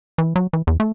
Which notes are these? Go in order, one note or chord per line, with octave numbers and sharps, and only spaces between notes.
E3
F#3
E3
E2
A3